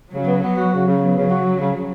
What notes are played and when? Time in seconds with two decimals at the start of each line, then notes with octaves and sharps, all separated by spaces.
0.12 C#3 F#3
0.27 B3
0.41 B3
0.56 F#4
0.71 C#3 F#3
0.85 C#3
1.00 B3
1.15 C#3
1.30 F#4
1.44 C#3
1.59 C#3
1.74 C#3